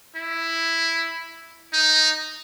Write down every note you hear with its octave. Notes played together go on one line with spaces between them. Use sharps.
E4
D#4